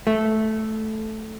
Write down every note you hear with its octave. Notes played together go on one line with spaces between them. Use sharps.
A3